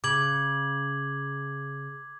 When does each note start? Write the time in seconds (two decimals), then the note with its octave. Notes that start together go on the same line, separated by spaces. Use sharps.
0.04 C#3 D6 G#6 F#7